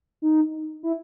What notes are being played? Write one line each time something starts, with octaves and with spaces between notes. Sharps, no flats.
D#4
E4